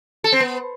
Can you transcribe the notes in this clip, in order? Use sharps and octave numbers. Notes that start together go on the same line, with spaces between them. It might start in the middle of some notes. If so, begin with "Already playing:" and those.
A4
C4
B3